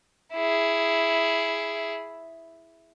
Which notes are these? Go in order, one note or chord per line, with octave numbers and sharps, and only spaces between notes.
E4 G#4